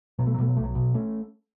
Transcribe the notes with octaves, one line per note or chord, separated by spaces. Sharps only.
B2 F#3
A3
F#3
B2 A3
F#3
B1 A3
F#3
B2
A3 C#4